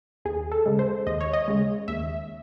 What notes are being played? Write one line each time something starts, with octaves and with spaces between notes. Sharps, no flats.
D#2 G#4
A4
C#3 G#3
C5
D#2 D#5
C#5
D#5
C#3 G#3
D#2 E5